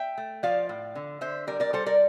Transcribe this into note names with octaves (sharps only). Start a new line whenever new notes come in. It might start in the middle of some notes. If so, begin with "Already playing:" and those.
Already playing: E5 G5
A3
F3 D5 F5
A2
D3
D3 C5 E5
G3 A#4 D5
A#4 D5
G3 A4 C5
A#4 D5